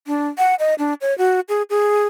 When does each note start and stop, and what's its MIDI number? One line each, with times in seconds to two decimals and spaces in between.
0.07 0.27 62
0.38 0.55 78
0.59 0.74 75
0.79 0.94 62
1.01 1.16 73
1.18 1.40 66
1.49 1.62 68
1.70 2.06 68